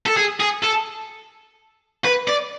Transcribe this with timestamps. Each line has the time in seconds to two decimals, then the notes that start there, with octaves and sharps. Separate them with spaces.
0.06 A4
0.17 G#4
0.40 G#4
0.64 A4
2.05 B4
2.28 D5